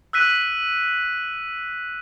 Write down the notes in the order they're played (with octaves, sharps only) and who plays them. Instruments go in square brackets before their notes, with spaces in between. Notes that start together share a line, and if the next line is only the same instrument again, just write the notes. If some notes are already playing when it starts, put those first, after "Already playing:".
[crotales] E6 F#6 B6 D#7